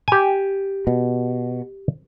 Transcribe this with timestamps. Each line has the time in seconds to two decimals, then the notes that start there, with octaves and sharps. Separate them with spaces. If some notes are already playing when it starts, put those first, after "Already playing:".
0.08 G4 G#5
0.87 B2